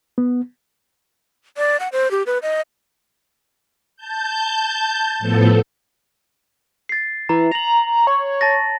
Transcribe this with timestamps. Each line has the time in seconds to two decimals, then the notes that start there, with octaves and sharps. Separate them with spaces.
0.18 B3
1.57 D5
1.80 F#5
1.92 C5
2.11 G4
2.26 B4
2.43 D#5
3.96 A5 G6
5.19 A2 F3 B3 A4
6.89 A6 C7
7.29 E3 A#5
7.52 A#5 F7 F#7
8.07 C#5
8.41 A5 A6 A#6